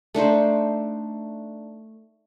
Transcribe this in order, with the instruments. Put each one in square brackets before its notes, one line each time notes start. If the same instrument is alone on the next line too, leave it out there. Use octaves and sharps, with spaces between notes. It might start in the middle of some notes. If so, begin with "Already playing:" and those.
[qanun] A3 D4 D#4 C5